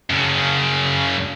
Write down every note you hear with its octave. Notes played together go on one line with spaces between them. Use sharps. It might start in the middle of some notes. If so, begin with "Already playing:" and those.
F#2 C#3